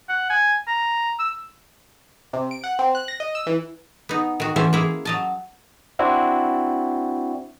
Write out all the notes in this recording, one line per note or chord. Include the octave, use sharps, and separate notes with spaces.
F#5
G#5
A#5
E6
C3
D7
F#5
C4
F#6
A#6
D#5
E6
E3
B3 D#4
D#3 F#4
E3 A3 C#4 C5 E5
A#3 E4 G#4
F#3 D#5 A5
C4 D4 E4 F#4